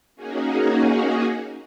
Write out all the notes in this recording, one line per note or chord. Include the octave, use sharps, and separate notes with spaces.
A#3 C#4 D#4 F#4 G#4